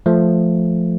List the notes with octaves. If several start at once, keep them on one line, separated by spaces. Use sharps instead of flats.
F3 A3